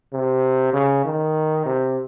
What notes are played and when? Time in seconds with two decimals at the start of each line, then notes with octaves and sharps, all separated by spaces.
0.13 C3
0.73 C#3
1.05 D#3
1.66 C3